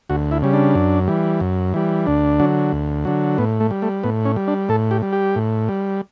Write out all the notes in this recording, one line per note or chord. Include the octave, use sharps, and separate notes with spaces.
D2 F#4
E4
C#3 G3
D4
F#2
E3 G3
F#2
E3 G3
D2 D4
D3 F#3
D2
D3 F#3
A2 B3
A3
G3
A3
A2 B3
C#4
G3
D4
A2 A4
G4
G3
G4
A2
G3